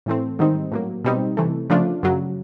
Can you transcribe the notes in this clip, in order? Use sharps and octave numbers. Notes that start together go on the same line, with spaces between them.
A2 E3 A3 C4
G#2 D#3 G3 C4 D#4
A2 F#3 A#3
B2 G3 C4 D#4
C3 E3 A3
C#3 F3 A3 D4 F4
F#2 C#3 F#3